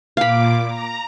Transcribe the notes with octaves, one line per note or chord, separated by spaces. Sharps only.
A#2 F5 B5 D6
A#5